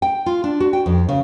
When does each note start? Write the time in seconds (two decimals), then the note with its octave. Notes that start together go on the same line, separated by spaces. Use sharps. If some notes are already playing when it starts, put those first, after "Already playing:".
0.02 G5
0.26 F4
0.44 D4
0.60 F#4
0.73 G5
0.86 F2
1.09 C#3